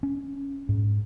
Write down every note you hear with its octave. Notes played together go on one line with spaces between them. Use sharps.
C#4
G#2